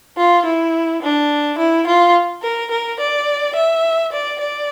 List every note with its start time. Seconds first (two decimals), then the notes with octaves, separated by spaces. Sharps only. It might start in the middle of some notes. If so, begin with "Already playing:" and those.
0.17 F4
0.46 E4
1.02 D4
1.58 E4
1.87 F4
2.43 A#4
2.71 A#4
3.00 D5
3.55 E5
4.12 D5
4.41 D5